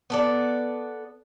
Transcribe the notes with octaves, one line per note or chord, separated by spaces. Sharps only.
B3 A4 D5